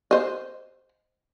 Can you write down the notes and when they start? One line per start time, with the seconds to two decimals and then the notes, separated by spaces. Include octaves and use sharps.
0.11 C5 D#5